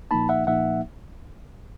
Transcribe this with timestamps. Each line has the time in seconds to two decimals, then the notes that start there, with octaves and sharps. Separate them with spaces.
0.11 A#2 F3 A#3 D#4 A5 B5
0.29 E5 F#5
0.47 A#2 F3 A#3 D#4 E5 F#5